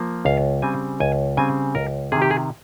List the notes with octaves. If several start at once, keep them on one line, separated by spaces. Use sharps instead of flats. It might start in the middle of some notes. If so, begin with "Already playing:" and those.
Already playing: F3 A#3
C#2 F5
C#3 G3 C4 G#5
C#2 G#5
C#3 G3 C4 G#5
C#2 A#4
C3 D#3 G#4
G4
G#4